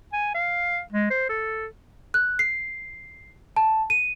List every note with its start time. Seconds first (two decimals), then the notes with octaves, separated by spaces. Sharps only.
0.13 G#5
0.34 F5
0.93 G#3
1.10 C5
1.29 A4
2.14 F#6
2.39 C7
3.56 A5
3.90 D#7